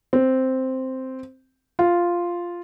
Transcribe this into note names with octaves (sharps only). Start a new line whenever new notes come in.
C4
F4